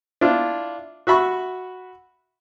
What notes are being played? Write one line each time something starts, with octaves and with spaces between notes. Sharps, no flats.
D4 E4 F4
F#4 E5 B5 C#6